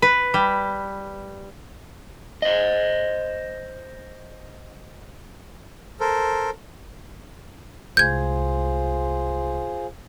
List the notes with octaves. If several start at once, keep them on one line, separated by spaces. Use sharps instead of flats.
B4
G3
C5 D#5
A4 A#4 C5
C2 G#3 F4 G#4 C5 G6 G#6